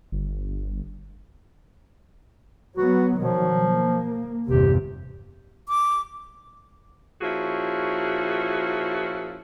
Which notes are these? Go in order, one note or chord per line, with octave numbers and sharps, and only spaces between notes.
G1
F#3 B3 F#4
B2 D#3 F3 F#3
A#3
G1 E2 C3 G4
D6
A#2 F3 C#4 E4 F#4 G#4